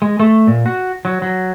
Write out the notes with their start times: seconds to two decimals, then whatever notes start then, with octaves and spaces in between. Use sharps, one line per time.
0.02 G#3
0.20 A3
0.47 A#2
0.66 F#4
1.05 F#3
1.22 F#3